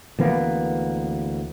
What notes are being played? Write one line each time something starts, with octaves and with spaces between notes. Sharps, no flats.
D2 E3 A#3 B3